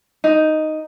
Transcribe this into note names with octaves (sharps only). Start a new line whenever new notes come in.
D#4